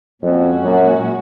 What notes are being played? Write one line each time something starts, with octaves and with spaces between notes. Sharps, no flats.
F2 A#2 G#3 C#4 F#4
F#2